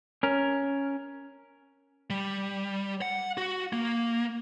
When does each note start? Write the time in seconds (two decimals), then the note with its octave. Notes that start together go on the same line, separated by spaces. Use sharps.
0.23 C#4 A#4
2.10 G3
3.02 F#5
3.37 F#4
3.73 A#3